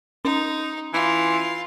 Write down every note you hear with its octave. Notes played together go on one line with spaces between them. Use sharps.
C#4 D#4
E3 F4